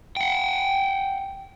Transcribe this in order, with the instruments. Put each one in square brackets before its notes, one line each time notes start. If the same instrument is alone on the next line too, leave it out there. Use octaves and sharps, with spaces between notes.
[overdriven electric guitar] F#5 G5